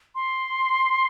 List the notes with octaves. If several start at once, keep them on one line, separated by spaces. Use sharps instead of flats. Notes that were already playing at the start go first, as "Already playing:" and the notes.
C6